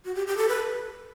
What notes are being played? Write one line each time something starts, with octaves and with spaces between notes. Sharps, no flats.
F#4
G4
G4
A4
B4